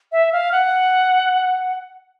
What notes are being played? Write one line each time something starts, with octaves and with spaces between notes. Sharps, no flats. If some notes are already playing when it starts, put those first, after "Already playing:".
E5
F5
F#5